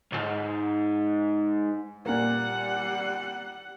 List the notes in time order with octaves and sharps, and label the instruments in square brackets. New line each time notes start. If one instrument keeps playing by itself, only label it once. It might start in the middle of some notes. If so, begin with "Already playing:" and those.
[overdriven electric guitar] B1 G#2
[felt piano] A#2 A#3 [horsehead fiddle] G3 F#5